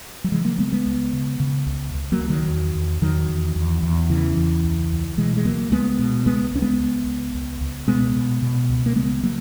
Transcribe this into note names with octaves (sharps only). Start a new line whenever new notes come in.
F#3
C#3 E3 G#3
F#3 A#3
C#3 G#3 B3
G#3 B3
C#2
C#3
C#3
C#2
C#2
F#3 A#3
C#2
D#3 F#3
E2
E2
E2 D#3 F#3
E2
E2
E2
C#3 E3
E2
C#2
C#2
B2 E3 G#3
G#3
C#2 F#3 A#3
C#2 G#3 B3
B2
C#2 G#3 B3
C#2 C#4
G#3 B3
C#2
C#2
C#2
C#2
B2 G#3 B3
B2
B2
C#2
A#3
C#3 G#3 B3
C#3 F#3 A#3